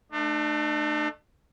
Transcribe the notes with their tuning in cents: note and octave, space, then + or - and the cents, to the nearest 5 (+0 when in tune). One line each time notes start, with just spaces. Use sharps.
A3 +0 D4 +40